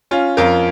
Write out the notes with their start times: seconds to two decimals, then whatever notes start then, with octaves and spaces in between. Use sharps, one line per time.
0.11 C#4 F4
0.37 F2 F4 A#4